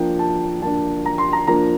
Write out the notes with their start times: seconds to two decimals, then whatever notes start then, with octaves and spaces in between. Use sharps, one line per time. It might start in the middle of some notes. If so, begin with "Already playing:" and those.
Already playing: F3 A#3 D4 G5
0.19 A5
0.62 F3 A#3 D4 A5
1.05 A#5
1.18 C6
1.33 A#5
1.47 F3 A#3 D4 A#5